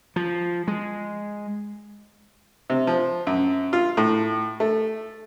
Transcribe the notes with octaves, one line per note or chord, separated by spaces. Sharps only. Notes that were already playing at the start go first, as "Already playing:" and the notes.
F3
G#3
C3
F3
F#2
F4
A2
A3